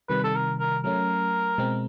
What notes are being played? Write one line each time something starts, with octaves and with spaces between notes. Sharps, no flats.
C3 D#3 G3 B4
A4
A#4
A#4
F#3 A3 C#4 A#4
B2 G#3 C4